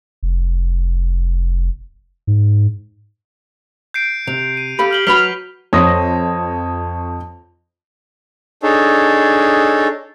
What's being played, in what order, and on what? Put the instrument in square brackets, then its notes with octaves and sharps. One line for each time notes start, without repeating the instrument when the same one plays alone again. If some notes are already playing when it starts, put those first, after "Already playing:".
[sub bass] F1
G#2
[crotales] G6 C7 D7
[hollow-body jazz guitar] C3 [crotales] F7
[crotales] D#7
[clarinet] G4 [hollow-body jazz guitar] A4 F5 B5
[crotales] F6 F#7 G7
[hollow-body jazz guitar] F#3 B4 B5 [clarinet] F6 [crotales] B6 F7 G7
[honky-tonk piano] F2 A#6 [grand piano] C5 C#5 D#6
[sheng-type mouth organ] D4 D#4 G#4 A4 C#5